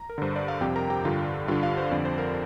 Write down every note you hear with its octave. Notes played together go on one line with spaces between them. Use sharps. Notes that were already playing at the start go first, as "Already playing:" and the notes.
Already playing: A#5
A#4
G2 D3 C5
D5
F5
F2 C3 G4 G5
A#4 A#5
G4 G5
G2 D3 F4 F5
G2 D3 F4 F5
F4 F5
C5
F2 D3 D5
C5
A#4